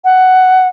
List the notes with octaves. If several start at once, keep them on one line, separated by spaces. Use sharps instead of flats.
F#5